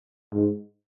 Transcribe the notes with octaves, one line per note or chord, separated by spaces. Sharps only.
G#2